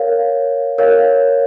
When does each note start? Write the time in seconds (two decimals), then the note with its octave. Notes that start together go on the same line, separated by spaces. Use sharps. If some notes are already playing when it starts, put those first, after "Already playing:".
Already playing: A#4 C#5 F5
0.78 A#4 C#5 F5